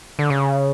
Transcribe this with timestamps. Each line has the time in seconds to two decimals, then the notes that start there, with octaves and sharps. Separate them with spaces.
0.19 D3
0.30 C#3